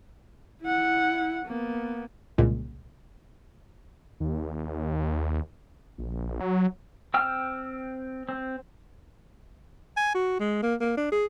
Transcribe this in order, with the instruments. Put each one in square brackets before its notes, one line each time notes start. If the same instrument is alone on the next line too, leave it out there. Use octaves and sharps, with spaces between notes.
[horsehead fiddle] E4 F#5
A#3 B3
[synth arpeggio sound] C2 A#2 C#3 G#3
[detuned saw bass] D#2
A#1
F#3
[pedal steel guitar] C4 G5 E6 F6
C4
[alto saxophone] G#5
F#4
G#3
A#3
A#3
D4
G#4